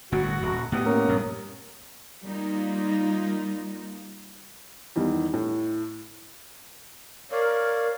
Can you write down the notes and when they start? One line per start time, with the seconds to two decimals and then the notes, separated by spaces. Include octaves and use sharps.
0.12 G1 A2 F#4
0.42 D#1
0.72 A2 B3 G4 F#5 D#6
0.86 A#3 C#4 A#4
1.08 A#1 G2
2.23 G3 A#3 D#4 F4
4.96 E2 D#3 G3
5.34 A2
7.32 A#4 C#5 D5 F5